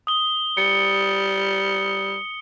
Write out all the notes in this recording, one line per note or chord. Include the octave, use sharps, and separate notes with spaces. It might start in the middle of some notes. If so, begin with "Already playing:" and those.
D#6 G7
G3 C#7